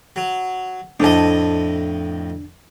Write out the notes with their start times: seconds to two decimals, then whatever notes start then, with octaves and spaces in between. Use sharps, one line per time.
0.16 F#3
1.00 F2 A2 D4 D#5 A5